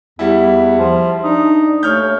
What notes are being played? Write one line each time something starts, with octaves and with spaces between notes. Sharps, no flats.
E2 G3 E4
F3
D4 D#4
D#2 A3 C#5 F6 G6